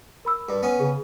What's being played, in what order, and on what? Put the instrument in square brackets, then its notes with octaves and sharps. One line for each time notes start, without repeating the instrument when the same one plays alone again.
[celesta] A#4 B5 E6
[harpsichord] G2
B3 C#4
[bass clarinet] C#3 [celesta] G#4